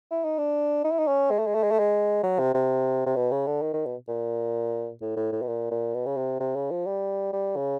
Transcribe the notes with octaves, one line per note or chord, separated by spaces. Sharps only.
E4
D#4
D4
D#4
E4
D#4
C#4
G#3
A3
G#3
A3
G#3
A3
G#3
F#3
C3
C3
C3
B2
C#3
D3
D#3
D#3
B2
A#2
A2
A2
A2
B2
A#2
A#2
B2
C#3
C3
C3
C#3
F3
G3
G3
C#3